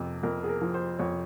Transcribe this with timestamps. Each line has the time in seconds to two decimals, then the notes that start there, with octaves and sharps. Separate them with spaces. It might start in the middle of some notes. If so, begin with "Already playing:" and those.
Already playing: F2 C3
0.23 F2 A#4
0.44 G#4
0.49 A#4
0.62 F3
0.74 C5
0.99 F2 C#5